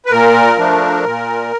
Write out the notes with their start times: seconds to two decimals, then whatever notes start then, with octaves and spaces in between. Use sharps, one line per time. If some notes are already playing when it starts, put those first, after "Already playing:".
0.06 B4
0.11 A#2 A#4
0.58 F3 A3 D4
1.05 A#2